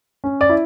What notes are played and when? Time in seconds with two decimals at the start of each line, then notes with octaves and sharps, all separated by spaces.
0.24 C#4
0.41 D5
0.49 E4